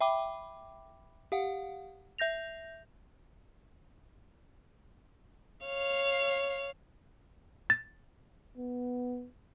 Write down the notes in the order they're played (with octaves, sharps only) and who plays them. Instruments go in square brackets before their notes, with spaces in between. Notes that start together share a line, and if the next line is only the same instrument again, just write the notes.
[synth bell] E5 G5 B5 D6
G4 F5 F#5
E5 G6 A#6 F7
[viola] C#5 F5
[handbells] A6
[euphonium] B3